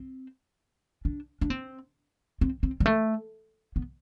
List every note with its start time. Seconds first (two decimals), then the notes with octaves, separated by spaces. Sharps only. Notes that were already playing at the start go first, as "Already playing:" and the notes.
Already playing: C4
1.05 D4
1.41 D4
1.50 C4
2.41 C4
2.63 C4
2.80 G3
2.86 A3
3.76 B3